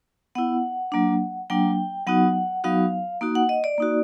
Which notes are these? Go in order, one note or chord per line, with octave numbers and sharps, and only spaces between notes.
B3 E4 F#5
F#3 A#3 D4
F#3 A#3 D4 G5
F#3 B3 D#4 F#4 F#5
F#3 B3 D#4 F#4 F5
A#3 D#4 F#4
F#5
D#5
D5
A#3 D#4 F#4